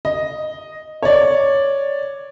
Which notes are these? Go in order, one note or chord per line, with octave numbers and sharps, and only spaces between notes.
D#5
C#5 D5